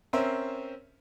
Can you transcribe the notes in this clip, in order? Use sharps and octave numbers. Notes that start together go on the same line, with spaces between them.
C4 C#4 A#4 C5 E5